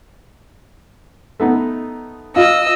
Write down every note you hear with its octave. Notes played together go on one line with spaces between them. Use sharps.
A3 B3 D#4
F4 D#5 E6